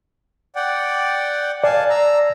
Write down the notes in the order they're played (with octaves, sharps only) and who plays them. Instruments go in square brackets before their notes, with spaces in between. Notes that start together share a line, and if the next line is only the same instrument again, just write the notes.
[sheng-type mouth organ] D5 F#5 G5
[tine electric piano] D5 [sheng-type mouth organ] F5 G#5 A5
[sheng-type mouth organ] A#5 E6